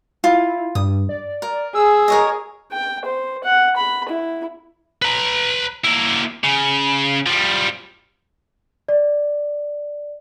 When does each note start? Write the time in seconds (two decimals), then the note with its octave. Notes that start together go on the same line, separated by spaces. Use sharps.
0.24 E4 F4
0.75 G2 D#6
1.09 D5
1.42 A#4
1.75 G#4 E6
2.08 A#4 C#5 D#5
2.72 G5
3.05 C5
3.44 F#5
3.77 B5
4.08 E4
5.02 B4 A#5
5.85 A#3 E4
6.44 C#3
7.26 F3 G3
8.88 D5